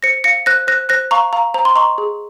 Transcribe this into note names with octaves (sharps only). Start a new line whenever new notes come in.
C5 A#6 C#7
F5 A#6 C#7
C5 F#6 A#6
C5 F#6 A#6
C5 F#6 A#6
F5 A#5 C#6
F5 A#5
C5 A#5
C6
D#5 A#5 C#6
G#4